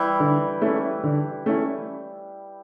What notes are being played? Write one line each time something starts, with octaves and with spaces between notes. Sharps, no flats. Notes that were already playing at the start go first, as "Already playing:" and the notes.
Already playing: E3 G3
D3
A3 C#4 E4
D3
A3 C#4 E4